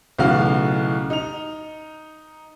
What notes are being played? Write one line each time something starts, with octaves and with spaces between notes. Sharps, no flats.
B1 A2 C#3 E3 F#4 F5
D#4 F7